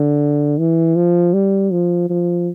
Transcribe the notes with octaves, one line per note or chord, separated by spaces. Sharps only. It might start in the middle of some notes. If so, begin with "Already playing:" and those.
Already playing: D3
E3
F3
G3
F3
F3